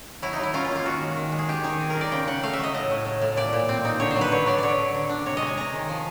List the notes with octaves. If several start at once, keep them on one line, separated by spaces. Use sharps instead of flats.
F#3 E4
D#4
F#3 E4
C#4 F4
F4
A#3
F4
D#3 F#4
G#3
D#3
G#3
G#4
D#3 G4
D#3 G#4
C4
A#4
D#3
D5
C#3 G5
C#3 F#5
A3 F5
E5
F#3 D#5
A2 D#5
A2
A2
A2
A#2 D5
A#2
C4
D#4
D3 C#5
C5
F#3
B4
D3 C#5
F#3 D5
D3 C#5 D5
D3
D3
D4
C3 C#5
D#5
G#3 G#5
C3 A#5
D#3
F3